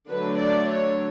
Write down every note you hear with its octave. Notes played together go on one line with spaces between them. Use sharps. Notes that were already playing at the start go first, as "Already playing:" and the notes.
D3 F#3 A3 D4 B4
D5
C#5